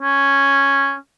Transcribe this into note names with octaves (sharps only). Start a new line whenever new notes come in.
C#4